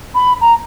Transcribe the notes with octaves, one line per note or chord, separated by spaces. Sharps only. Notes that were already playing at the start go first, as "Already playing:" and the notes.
B5
A#5